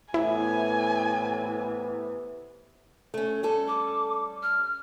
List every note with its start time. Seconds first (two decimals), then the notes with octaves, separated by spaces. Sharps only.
0.14 A2 C3 E3 B3 E4 G#5
3.14 A3 C#4
3.43 G3 C#4 A4
3.68 D6
4.43 F6